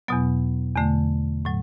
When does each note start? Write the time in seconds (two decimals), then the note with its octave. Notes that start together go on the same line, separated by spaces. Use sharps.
0.08 E2 B2 F#3 B3
0.76 E2 D3 A3
1.45 A2 F#3